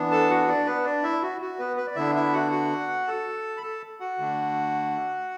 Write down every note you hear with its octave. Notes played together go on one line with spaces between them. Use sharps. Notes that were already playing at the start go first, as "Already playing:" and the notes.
Already playing: E3 B3 D4
A4 A5
F#4 F#5
D4 D5
B3 B4
D4 D5
E4 E5
F#4
F#4
B3 B4
B4
D5
D3 B3 D4 E4 E5
E4 E5
F#4 F#5
F#4 F#5
A4 A5
B5
A4 A5
F#4 F#5
D3 A3 D4